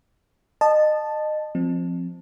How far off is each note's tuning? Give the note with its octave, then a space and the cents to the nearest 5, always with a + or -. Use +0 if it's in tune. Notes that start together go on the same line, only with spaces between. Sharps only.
D#5 -25 A5 +0
F3 +0 C4 +0